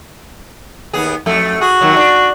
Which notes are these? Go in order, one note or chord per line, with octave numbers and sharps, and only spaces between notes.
D#2 B3 G#4
F2 A3
F#4 G#4
D#2 D#3 F#3
D4